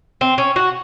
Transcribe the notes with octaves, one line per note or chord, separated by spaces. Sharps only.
C4
C#4
F#4